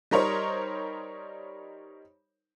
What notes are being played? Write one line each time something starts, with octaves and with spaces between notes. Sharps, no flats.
G3 D#4 A#4 C5 C#5